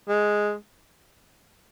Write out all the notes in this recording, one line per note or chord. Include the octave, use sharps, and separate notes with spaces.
G#3